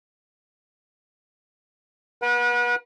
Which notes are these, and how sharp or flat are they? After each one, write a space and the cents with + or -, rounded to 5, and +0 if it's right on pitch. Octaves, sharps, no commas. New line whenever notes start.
B4 -35 F#5 -25